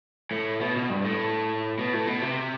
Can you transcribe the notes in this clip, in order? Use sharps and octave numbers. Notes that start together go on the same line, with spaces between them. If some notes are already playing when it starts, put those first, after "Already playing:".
A2
B2
B2
G2
A2
B2
A2
B2
C3